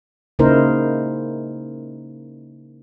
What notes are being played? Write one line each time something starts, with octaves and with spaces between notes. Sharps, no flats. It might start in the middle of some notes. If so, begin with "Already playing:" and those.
C#3 A#3 D#4 E4 A#4 C5